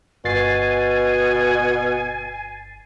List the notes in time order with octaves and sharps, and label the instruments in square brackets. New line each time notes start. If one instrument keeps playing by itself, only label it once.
[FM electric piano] G1 A6 C7 [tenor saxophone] B2 [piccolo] G#5